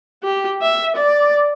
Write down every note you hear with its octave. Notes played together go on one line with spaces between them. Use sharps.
G4
E5
D5